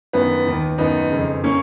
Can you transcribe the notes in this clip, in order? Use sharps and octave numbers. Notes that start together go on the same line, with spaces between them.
F#2 D#3 B3
D#2 D#3
F#2 D#3 B3 D#4
F2 C#3
A#3 C#4